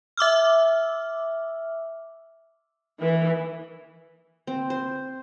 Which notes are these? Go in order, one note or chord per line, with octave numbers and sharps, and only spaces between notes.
E5 D6 E6 F6
E3
C4
C5